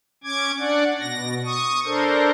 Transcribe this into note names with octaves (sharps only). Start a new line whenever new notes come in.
C#4 D6 G#6
D4 D5 F#5
B2 A#6
C#6 D#6
D4 A4 A#4 C5